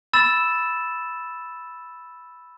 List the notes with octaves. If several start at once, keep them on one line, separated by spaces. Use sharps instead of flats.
B5 E6 A6 E7